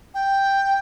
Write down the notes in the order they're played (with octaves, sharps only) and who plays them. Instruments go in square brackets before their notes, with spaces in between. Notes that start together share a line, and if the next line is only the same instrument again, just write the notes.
[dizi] G5